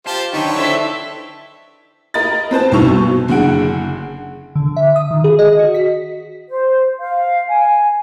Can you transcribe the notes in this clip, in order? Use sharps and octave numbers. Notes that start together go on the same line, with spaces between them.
F4 G4 C5 A5
F#2 D3 C4 D#4 B4 C#5 G5
D4 E4 A4 C5 E5
A#4 D#5 B5 A6
C4 B4 C5 A5
B1 G2 D#4 C#6 E6 F7
B2
F#1 D3 G#4 F#5 D7
D3
E5
D#6
D#3
G#4
D#5
F#4
B6
C5
F5
G#5